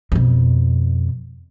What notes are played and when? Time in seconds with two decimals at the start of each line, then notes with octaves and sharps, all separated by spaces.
0.12 F2 B2